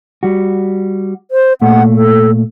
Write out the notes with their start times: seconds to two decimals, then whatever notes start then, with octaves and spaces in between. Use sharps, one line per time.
0.23 G3 F#4
1.31 C5
1.62 A#2 A3 F#5
1.94 A4